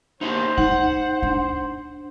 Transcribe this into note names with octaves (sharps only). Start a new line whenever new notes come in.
D#4 E4 G4 C5
D#4 F#5
D4